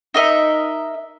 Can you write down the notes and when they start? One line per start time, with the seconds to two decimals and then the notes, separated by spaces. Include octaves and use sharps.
0.14 D#4 A#4 D#5 E5